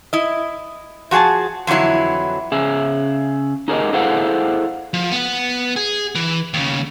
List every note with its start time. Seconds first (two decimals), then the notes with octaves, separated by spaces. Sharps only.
0.13 E4 D#5
1.11 F3 F#4 G#4 G#5 A5
1.67 F2 D3 E3 F#3 E4
2.52 C#3 G#4 E5
3.68 D#4 G4 G#4 A#4 C5 D#5
3.93 E4 G#4 A4 C5 F5 F#5
4.93 F3
5.12 B3 F#5
5.76 G#4
6.15 E3
6.54 D#2 C#3